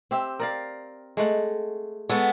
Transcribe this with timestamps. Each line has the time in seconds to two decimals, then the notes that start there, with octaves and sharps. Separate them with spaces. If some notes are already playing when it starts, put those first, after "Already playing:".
0.11 C4 G4 E5
0.39 A#4 D5 F5
1.17 G#3 A3 F#5
2.09 G#3 B3 A4 C#5